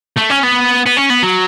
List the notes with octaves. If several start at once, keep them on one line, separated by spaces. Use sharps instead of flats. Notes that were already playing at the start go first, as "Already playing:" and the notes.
A3
C#4
B3
B3
C#4
B3
F#3